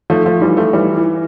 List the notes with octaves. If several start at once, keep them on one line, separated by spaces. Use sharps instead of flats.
F3 A3
F3 A3
E3 G3
F3 A3
E3 G3
E3